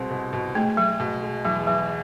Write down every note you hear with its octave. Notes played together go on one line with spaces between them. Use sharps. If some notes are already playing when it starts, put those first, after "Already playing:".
Already playing: C2 B2 G#3 C4
B2
B2
G#3 A3
F#3 G#3
B2
G#3
E2 F#3
E2 F#3